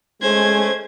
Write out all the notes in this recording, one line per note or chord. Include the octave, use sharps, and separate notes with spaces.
G#3 A3 C#4 C5 G#6